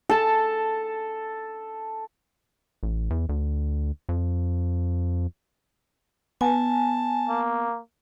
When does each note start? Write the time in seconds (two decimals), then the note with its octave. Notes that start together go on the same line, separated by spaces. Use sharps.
0.09 A4 A5
2.83 A1
3.10 E2
3.29 D2
4.09 F2
6.41 B3 G#5 A5
7.28 A#3